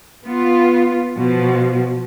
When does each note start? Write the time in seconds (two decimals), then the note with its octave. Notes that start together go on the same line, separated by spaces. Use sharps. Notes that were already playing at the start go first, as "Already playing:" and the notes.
0.24 B3 F4
1.16 B2 F3